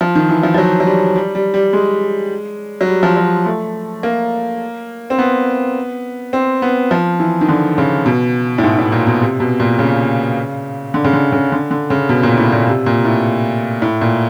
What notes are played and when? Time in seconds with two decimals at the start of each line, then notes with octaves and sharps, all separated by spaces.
0.01 F3
0.15 D#3
0.29 E3
0.43 F3
0.54 F3
0.58 F#3
0.80 F#3
0.86 G3
1.16 G3
1.35 G3
1.54 G3
1.73 G#3
2.81 F#3
2.88 G3
3.03 F3
3.17 F#3
3.46 A3
4.03 A#3
5.10 C4
5.19 B3
6.33 C4
6.62 B3
6.91 F3
7.20 E3
7.41 D#3
7.49 D3
7.78 C#3
8.06 B2
8.58 A2
8.63 G#2
8.79 A2
8.92 A#2
9.07 B2
9.21 C3
9.40 B2
9.60 A#2
9.79 C#3
10.94 D3
11.04 C#3
11.13 D3
11.32 C#3
11.52 D3
11.71 D3
11.90 C#3
12.09 B2
12.23 A#2
12.38 A2
12.52 A#2
12.67 C3
12.86 A#2
13.05 A2
13.82 A2
14.01 A#2